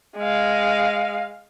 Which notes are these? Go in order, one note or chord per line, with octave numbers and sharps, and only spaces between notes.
G#3 F5